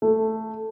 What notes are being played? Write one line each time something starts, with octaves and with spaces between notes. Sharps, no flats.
A3